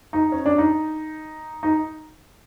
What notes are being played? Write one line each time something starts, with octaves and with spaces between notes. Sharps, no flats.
D#4
C#4
D4
D#4
D#4